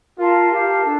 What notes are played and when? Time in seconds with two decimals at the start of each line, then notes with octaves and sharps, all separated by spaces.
0.18 F4 A#4 F5 A5
0.51 G4 A#4 F5 A5
0.84 D4 A4